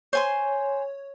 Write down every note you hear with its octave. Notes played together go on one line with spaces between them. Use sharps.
C5 C#5 G#5 C6